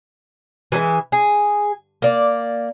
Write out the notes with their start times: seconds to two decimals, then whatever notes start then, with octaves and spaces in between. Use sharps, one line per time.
0.72 E3 G#3 A4 E5
1.12 G#4
2.02 A#3 D5